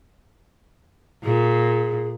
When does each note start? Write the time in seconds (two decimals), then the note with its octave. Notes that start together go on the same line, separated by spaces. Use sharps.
1.25 A#2 G#4